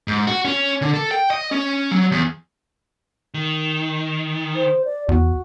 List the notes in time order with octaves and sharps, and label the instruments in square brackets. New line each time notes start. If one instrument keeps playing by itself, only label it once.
[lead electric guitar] G#2
F#4
C#4
D3
A4
G5
D#5
C#4
F#3
E2
D#3
[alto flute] C5
D5
[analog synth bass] E2 [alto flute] F#4